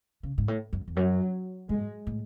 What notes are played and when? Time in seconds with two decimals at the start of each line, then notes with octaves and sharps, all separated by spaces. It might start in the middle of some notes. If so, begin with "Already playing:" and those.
0.23 C#3
0.38 G#2
0.48 A2
0.73 F#2
0.88 E2
0.97 F#2 F#3
1.69 G#2 G#3
2.07 A2